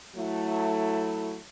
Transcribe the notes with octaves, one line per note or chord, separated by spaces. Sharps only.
F#3 A3 E4